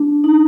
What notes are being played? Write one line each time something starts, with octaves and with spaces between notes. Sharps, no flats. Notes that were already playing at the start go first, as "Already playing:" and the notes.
Already playing: D4
D#4